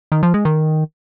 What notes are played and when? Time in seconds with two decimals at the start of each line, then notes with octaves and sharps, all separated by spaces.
0.12 D#3
0.23 F3
0.34 G#3
0.45 D#3